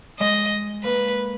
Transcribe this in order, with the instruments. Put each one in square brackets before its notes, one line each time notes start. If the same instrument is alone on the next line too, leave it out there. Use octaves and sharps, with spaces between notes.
[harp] G#3 [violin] D#5
[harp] A#3 [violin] B4